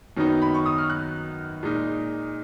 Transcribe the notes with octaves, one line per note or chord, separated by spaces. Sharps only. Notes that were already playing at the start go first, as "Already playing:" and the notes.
F#2 D#3 F#3 B3 D#4
B5
C#6
D#6
F6
F#6
A#2 G#3 D#4